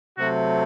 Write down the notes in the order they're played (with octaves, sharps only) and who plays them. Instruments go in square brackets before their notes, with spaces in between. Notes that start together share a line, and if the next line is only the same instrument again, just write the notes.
[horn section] C3 F#3 A3 F#4